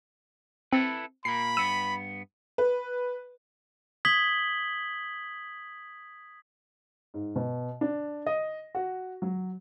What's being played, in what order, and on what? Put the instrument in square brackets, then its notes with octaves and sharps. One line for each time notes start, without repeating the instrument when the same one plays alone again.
[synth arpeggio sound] C4 [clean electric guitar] E4 A4 B4
[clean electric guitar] A#2 A#3 [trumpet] B5 [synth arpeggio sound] C7
[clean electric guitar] G2 B3 [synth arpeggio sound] E6 D#7 E7
[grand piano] B4
[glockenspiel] D#6 G#6 B6 F#7 G7
[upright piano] G#2
B2
D4
D#5
F#4
F#3